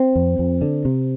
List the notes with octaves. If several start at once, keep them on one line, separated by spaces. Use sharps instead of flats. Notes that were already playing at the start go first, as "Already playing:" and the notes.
Already playing: C4
F2
F2
D3
C3